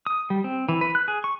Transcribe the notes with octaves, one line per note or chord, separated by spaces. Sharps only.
D#6
G3
C4
E3
B4
F#6
G#4
C#6